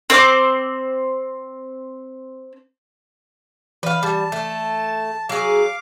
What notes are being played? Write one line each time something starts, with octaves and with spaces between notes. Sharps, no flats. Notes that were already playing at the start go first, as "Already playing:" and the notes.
C4 C5 D6
E3 B4 F5
G3 A5
A3
F#3 G#4 F5 D6